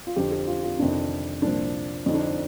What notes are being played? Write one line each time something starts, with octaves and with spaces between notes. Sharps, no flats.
F4
F2 D3 F3 G4
G4
F4
F4
F2 C3 D#3 D4
C2 A#2 F3 D4
F2 D3 F3 D#4
D4
D#4